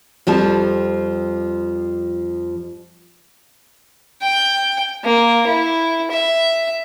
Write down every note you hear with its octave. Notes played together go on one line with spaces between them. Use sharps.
F2 F3 G3 A5
G5
A#3
E4
E5